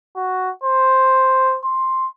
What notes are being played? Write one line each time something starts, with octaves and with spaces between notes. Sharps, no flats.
F#4
C5
C6